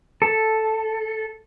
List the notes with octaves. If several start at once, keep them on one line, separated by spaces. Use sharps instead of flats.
A4